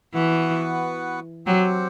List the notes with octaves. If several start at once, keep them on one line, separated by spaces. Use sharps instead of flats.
E3 B3 F#4 B4 F#5
F#3 C4 G4 C5 F#5